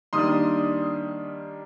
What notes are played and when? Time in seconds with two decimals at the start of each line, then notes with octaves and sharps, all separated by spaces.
0.13 D#3 G3 A#3 D4 C6 D#6